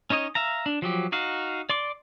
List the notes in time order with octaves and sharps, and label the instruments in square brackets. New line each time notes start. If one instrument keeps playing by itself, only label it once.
[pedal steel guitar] C#4 D#4 C#5 D#5
E5 F5 A#5
D4
F3 F#3 G4
D#4 F#4 F5
D5 C6 D6